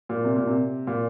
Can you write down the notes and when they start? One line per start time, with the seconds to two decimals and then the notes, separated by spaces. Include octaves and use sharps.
0.09 A#2
0.24 C3
0.36 A#2
0.47 C3
0.87 A#2